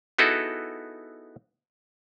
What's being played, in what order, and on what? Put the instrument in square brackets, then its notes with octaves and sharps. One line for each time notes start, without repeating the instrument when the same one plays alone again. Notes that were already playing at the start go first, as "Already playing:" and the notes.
[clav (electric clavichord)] B3 D#4 E4 F#4 G#4 A4